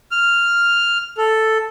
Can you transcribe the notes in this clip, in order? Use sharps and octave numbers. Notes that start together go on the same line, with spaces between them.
F6
A4